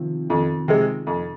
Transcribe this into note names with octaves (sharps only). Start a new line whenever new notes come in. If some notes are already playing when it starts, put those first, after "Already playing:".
Already playing: C3 D#3 F3
F2 D#3
C3 G#3
F2